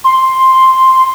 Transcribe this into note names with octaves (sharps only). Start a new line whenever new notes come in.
C6